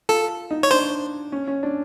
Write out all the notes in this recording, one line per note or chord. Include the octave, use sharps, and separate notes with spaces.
F4 A4
D#4
C#5
D4 C5
C#4
C#4
D4